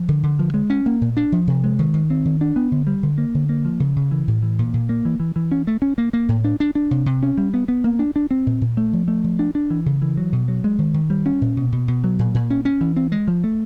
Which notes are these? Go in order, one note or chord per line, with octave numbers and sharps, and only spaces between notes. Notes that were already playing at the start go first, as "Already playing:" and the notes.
Already playing: F3
D3
D3
F3
G#3
C#4
A#3
A#2
D4
F3
C3
G#3
D#3
D#3
C4
D#3
D4
B3
D3
G3
D3
A#3
D3
A#3
F3
C#3
C#3
E3
A2
E3
A#2
A#2
A#3
E3
E3
E3
C#4
A3
C#4
A#3
A#3
A2
D4
D4
D4
C3
C3
C#4
G3
B3
B3
A#3
D4
D4
C4
A#2
A#2
A3
F3
A3
F3
D4
D4
E3
C#3
E3
F#3
B2
F#3
G#3
D#3
D#3
G3
C#4
A#2
B2
B2
B2
F#3
A#2
A#2
C#4
C#4
E3
C4
G#3
F3
A3